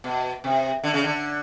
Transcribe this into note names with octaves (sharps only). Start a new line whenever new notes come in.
B2
C3
D3
C#3
D3